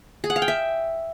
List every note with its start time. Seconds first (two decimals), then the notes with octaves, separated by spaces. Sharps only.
0.24 G#4
0.30 F#5
0.36 F5
0.42 G5
0.48 E5